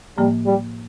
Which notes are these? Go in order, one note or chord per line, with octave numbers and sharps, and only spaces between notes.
A2 F3 G3 A#3
G3